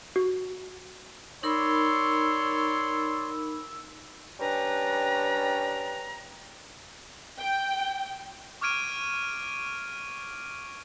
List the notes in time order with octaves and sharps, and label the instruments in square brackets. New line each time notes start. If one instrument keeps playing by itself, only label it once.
[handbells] F#4
[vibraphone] D#4 A#4 B5 [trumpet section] C#5 D5 C6 [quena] E6
[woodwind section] G3 C#4 D4 B4 G5 A#5
[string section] G5
[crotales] C#6 D6 F6 G#6 D7 D#7